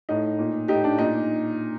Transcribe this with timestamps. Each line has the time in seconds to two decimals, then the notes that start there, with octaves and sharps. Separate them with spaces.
0.09 A2 D#4
0.39 A#2
0.68 A2 D#4 G4
0.84 D4
0.98 A#2 D#4